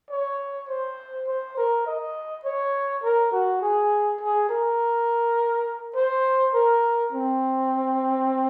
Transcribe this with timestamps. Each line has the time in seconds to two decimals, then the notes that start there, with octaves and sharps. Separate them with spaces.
0.10 C#5
0.69 C5
1.27 C5
1.57 A#4
1.86 D#5
2.45 C#5
3.03 A#4
3.32 F#4
3.62 G#4
4.21 G#4
4.49 A#4
5.95 C5
6.54 A#4
7.13 C4